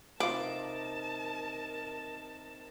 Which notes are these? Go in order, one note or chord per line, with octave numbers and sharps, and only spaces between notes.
C3 D#4 F4 A#4 B4 A5 D6